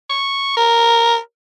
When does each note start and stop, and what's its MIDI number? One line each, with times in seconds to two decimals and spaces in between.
0.10 0.54 85
0.57 1.18 70